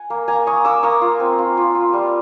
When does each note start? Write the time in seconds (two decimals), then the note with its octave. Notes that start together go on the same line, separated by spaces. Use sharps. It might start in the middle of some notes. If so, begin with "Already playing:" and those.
Already playing: F#5 G#5
0.10 A#3
0.28 A#3 G#5 A#5
0.47 A#3 C#6 D#6
0.65 A#3 D6 E6
0.83 A#3 C#6 D#6
1.01 F4
1.20 C4
1.39 F4
1.57 F4
1.75 F4
1.93 G3